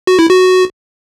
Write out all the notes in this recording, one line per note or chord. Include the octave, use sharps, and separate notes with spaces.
F#4
E4
F#4